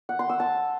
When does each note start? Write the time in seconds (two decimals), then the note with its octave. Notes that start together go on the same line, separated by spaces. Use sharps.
0.09 F#5
0.19 C6
0.29 E6
0.40 A5